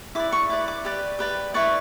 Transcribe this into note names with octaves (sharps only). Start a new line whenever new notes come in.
E4 B4 D5 D6
C#6
E4 B4 D5 D6
D6
G4 B4 D5
G4 B4 D5
E4 B4 D5 C#6